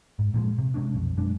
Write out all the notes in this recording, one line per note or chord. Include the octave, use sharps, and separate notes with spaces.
G#2
A#2 F3 G#3
C3
C3 G#3 C#4 D4
B1 F2
F#2 B2 G#3 D4